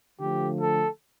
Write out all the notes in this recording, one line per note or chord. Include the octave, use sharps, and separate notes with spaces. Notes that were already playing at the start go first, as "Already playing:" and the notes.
D3 F3 A3 G4
A4